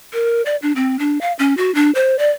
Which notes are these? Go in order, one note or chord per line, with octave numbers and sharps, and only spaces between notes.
A#4
D5
D4
C4
D4
F5
C#4
F#4
D4
C5
D5